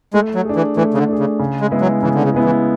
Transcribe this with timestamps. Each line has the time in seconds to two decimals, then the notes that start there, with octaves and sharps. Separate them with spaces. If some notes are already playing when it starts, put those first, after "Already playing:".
0.14 G#3 A3
0.35 F#3
0.45 D4 G#4
0.56 E3
0.77 E3 A3
0.94 C#3
0.98 D3
1.08 D4 G#4
1.19 C#3
1.39 C#3
1.60 G#3
1.71 G#3 B3 E4
1.81 F#3
2.03 C#3 E3
2.15 D3
2.24 C#3
2.34 G#3 B3 E4
2.44 E3